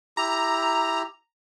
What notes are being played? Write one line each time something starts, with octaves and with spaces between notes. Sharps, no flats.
E4 G4 A#5